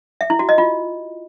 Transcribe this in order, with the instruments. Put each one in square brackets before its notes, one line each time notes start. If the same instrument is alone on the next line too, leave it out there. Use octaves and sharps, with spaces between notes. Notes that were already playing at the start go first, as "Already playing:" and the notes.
[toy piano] E5
E4
F#4
D#5
F4